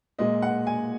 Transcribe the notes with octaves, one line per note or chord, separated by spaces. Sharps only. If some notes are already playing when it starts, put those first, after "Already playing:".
A#2 G#3 D#5
F#5
G#5